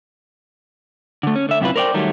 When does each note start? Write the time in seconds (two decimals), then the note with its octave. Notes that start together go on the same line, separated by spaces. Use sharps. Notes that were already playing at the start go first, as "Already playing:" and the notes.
1.23 D3 A3
1.35 C#4
1.49 D3 E5
1.60 F#2 C3 E4 F4 B4
1.76 A#4 C5 D5 F5 G5
1.94 D#3 F#3 G3 A3